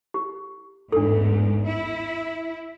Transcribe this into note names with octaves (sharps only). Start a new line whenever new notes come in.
G4
A1 E2 G#2 D4 A4
E4